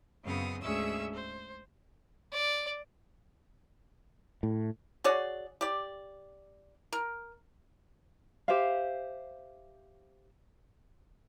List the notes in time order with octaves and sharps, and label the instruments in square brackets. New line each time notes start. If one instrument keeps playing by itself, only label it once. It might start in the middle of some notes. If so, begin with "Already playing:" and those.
[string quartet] F#2 C#3 B3 C4 F5 D#6
D2 G#2 C#4 G#4 E5 E6
C5
[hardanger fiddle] D5
[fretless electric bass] A2
[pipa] F#4 G#4 C#5 D5
G4 D5
A#4
[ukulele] G4 C5 E5 F5